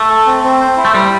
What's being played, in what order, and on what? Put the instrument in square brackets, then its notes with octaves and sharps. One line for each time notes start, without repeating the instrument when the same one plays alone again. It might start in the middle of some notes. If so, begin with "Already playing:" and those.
Already playing: [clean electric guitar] A3
[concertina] A4
C4
C4
C5
E4
[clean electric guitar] A3
[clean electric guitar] G3 [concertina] C5